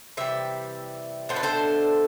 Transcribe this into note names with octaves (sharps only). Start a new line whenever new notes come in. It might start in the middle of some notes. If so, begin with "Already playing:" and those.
C3 E3 G3 E5
B2 A3 D4 C5
B4
A4 C5